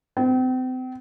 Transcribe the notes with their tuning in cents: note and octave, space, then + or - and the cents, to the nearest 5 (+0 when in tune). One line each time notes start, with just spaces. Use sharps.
C4 -35